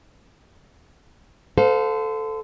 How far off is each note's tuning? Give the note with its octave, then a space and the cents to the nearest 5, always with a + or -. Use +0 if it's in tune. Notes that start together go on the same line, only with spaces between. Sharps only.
A4 +0 C5 -35 F5 +35